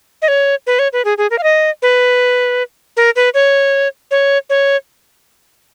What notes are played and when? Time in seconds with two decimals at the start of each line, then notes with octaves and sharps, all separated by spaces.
0.22 D#5
0.28 C#5
0.67 B4
0.79 C#5
0.93 B4
1.05 G#4
1.18 G#4
1.31 A#4
1.38 F5
1.43 D#5
1.82 B4
2.97 A#4
3.16 B4
3.34 C#5
4.11 C#5
4.50 C#5